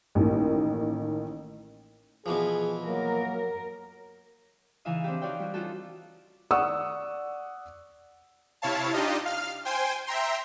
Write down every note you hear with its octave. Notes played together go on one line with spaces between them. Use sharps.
A1 D#3 A#3
B2 E3 F3 G#4
F#3 A#3 A#4
C#3 E3 D#4 E5 F5 D#6
C4 D4 G4
D#4 F#4 C#5 D5 F5 G5
G3 F#4
C#4 D#4 F4 F#4 A4
D5 F#5 C#6 D#6 E6
C3 E4 C#5 F5 A5
D4 D#4 F4 G4 D#5
F5 F6
C5 G5 G#5 C6
E5 G5 A#5 C6